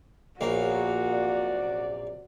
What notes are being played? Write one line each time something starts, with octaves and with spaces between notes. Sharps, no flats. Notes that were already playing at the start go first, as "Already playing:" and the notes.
A#1 A#2 A#3 B3 F#4 G#4 C#5
F#2 C3 D5